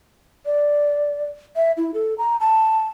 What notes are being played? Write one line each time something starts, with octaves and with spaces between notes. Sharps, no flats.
D5
E5
E4
A4
A#5
A5